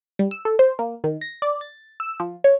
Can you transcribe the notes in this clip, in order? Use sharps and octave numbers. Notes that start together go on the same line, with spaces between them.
G3
E6
A4
C5
A#3
D#3
A#6
D5
A6
E6
F3
C#5